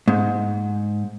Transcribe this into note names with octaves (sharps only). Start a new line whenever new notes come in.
G#2